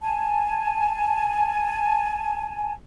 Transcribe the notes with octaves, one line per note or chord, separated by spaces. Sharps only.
G#5 A5